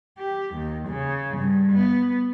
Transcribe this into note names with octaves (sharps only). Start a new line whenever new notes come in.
G4
D#2
C#3
G2
B3